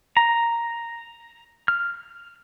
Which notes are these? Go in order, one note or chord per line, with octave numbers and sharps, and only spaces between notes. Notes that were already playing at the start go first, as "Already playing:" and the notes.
A#5
F6